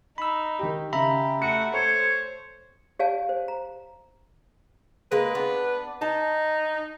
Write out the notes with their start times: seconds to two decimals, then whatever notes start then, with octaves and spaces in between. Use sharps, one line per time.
0.18 D#4 B5 E6
0.59 D#3 G4
0.93 C#3 G4 E5 A#5 B5
1.42 A3 F#4 C#7
1.74 A4 C5 C#5
2.99 G4 C#5 D5 F5 G#5 A5
3.29 C5
3.48 A#5
5.12 G#3 A#3 A#4 B4
5.35 B3 D4
6.02 D#4 A5